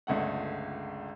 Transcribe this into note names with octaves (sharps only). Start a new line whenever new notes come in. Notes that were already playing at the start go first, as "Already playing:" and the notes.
G1 C#2 A3 F#5